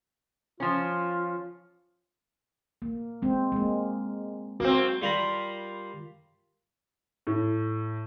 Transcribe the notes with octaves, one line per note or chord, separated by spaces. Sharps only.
F3 C#4 F4
A#3
G#3 C4
G#3 A#3
A#3 C4 F#4
G3 F4 A#4 B5
A2